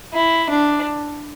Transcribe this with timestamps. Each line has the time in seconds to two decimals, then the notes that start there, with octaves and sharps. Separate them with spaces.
0.14 E4
0.50 D4